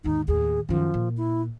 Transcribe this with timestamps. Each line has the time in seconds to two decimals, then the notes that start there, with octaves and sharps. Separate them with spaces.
0.04 D#2 G#2 D#4
0.28 D#2 A2 G#4
0.69 F#2 D#3 F3
0.94 A#2
1.17 E4